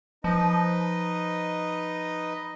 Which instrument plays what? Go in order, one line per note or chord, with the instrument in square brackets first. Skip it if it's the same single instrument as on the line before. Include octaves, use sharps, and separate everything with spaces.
[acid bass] F3 [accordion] D#4 B4 D#5